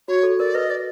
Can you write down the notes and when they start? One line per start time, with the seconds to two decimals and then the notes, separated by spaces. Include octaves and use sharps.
0.08 F#4 C#5
0.23 A4
0.39 A#4 D5
0.55 B4 D#5
0.70 D5